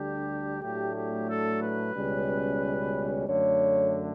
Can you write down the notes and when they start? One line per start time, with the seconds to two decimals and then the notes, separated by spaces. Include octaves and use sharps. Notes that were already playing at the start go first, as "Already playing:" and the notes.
Already playing: D2 D3 G3 D4 G4
0.62 A2 F#3 A3 D4 G4
0.95 G4
1.28 A4
1.61 B4
1.94 C#2 B2 G3 C#4
3.27 F#2 D3 A3 C#5